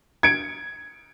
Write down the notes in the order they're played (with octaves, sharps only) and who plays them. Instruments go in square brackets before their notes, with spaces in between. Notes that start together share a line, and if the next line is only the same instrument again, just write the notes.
[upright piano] G#6 C#7 D7